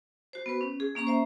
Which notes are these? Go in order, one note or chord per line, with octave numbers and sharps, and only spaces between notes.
F#4 C5
B3 B4
C#4
G#4
A#3 C#4 A#5 C#6
C5 E5 A#5